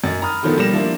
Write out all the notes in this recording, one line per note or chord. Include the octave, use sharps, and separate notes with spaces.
F#2 D#5 A6
A#5 B5 D#6 F6
D3 D#3 F3 F#3 A3 B3
B2 G3 A#3 A#6 E7
F3 A#3 D4 E4